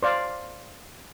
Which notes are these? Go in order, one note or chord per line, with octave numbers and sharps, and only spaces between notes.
C5 D5 F5